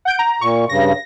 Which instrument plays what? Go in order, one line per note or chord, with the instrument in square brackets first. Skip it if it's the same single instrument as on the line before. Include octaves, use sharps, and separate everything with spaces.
[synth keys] F#5 G6 D7
A#5
[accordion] A#2 [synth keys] C#6
[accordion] G2 C#3 [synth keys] A#6